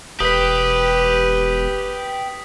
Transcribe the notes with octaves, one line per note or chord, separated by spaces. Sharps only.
E1 G4 B4 D#6 B6